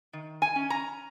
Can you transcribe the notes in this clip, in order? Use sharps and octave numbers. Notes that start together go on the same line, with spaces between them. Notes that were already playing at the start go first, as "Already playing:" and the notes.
D#3
G#5
C#4
A#5